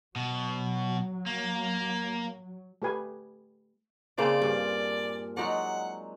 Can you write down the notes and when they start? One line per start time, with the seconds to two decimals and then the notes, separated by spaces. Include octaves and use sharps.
0.16 B2 F#3
1.26 A#3
2.82 A3 G4 B4 G#5
4.18 C#3 A#3 C4 D4 G#4 C5 D5
4.42 G2 A#2
5.37 F#3 G#3 D#4 D5 F#5